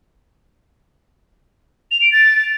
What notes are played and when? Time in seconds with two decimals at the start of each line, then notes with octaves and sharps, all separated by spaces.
1.91 F7
2.02 D7
2.12 A6